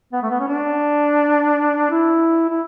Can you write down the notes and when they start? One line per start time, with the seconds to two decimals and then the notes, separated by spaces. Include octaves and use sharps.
0.13 B3
0.22 A3
0.30 B3
0.39 C#4
0.48 D4
1.91 E4
2.49 E4